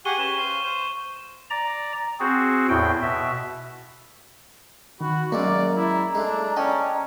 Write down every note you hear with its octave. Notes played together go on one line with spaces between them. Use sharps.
G4 G#4 F#5 C#6 D#7 G7
C#4 B4 E7 G7
C5 F5
C5
D5 A#5
C4 F#4 G#4
E2 A2 G5
B2 E5
D#3 F#4 B5
F#2 G#3 A#3 F#4 D5 A#5
E4
G#3 A3 D4
C#4 D5 D#5 G5 A5